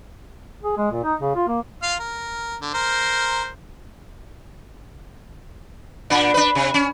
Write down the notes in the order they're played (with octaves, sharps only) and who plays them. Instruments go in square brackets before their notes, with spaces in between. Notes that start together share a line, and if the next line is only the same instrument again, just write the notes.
[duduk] G#4
G#3
A#2
D#4
C#3
F4
A#3
[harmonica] F4 F5
A#4
D3
A#4 C5
[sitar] A#2 D4
D4 B4
C3
C#4